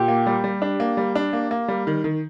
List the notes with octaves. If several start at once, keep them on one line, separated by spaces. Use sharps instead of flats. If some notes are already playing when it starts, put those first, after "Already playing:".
Already playing: A#2 G4
A#3
G3
G3
D4
A#3
G3
D4
A#3
A#3
G3
D#3
D#3